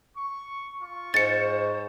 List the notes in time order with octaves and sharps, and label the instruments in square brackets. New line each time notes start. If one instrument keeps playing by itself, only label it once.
[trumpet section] C#6
F4 C#6
[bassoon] G#2 [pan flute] C5 [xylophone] A6 C#7